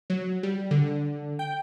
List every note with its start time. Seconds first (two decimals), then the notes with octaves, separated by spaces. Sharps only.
0.10 F#3
0.43 G3
0.71 D3
1.39 G5